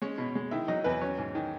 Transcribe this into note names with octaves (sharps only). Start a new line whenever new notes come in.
G#3 C#4 C#5
B2
G#3
D#3 E4 E5
F#3 D#4 D#5
E2 B3 B4
F#3 C#4 C#5
G#2
D#3